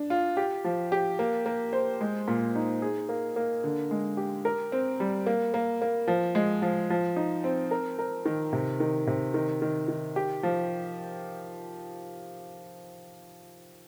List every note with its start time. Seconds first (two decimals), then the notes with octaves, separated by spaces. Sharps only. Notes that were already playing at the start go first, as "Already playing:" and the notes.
Already playing: D4
0.10 F4
0.37 G4
0.64 F3
0.92 G4
1.19 A#3
1.46 A#3
1.73 C5
2.01 G#3
2.28 A#2
2.55 D#4
2.82 G#4
3.09 A#3
3.36 A#3
3.64 D3
3.91 G#3
4.17 G4
4.45 A#4
4.72 C4
5.00 G3
5.26 A#3
5.54 A#3
5.82 A#3
6.08 F3
6.35 G#3
6.62 F3
6.90 F3
7.16 D#4
7.44 C4
7.71 A#4
7.99 A#4
8.26 D#3
8.53 C3
8.80 D#3
9.07 C3
9.34 D#3
9.62 D#3
9.88 D#3
10.16 G4
10.43 F3